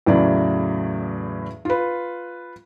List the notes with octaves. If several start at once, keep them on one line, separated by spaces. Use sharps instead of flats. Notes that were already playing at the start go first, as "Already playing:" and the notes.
E2 A2 C#3 E3 F#3 D5
F4 B4